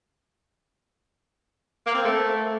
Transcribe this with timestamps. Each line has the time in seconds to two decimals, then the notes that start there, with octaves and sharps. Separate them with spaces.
1.86 A#3
1.95 C4
2.04 A3